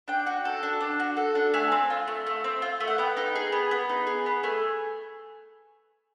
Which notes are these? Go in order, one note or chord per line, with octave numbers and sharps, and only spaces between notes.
D4 G5
F#4
A4
D4
D4
F#4
A4
D4
A3 G#5
C4
F4
A3
A3
C4
F4
A3
F#5
B3 G5
D#4
G#4
B3
B3
D#4
G#4
B3
A3 G#5